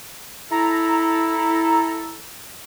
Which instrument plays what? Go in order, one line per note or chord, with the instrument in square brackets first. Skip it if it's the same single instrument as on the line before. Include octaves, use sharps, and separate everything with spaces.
[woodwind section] E4 A4 [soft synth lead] A#5